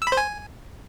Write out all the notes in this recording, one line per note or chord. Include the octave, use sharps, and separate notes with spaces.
E6
B5
C5
G#5